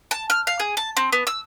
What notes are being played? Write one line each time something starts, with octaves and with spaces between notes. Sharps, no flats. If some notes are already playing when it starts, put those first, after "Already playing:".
A5
F6
F5
G#4
A5
C4
B3
E6